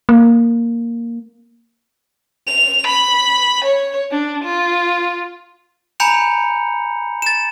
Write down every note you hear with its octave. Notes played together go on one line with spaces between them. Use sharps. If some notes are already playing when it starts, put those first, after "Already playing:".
A#3
F7
B5
C#5
D4
F4
G#5 A#5 B5 G6 C#7 F7
A6 E7